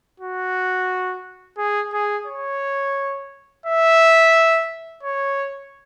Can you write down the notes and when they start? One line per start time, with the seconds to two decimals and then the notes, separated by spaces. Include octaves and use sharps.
0.20 F#4
1.58 G#4
1.93 G#4
2.27 C#5
3.66 E5
5.03 C#5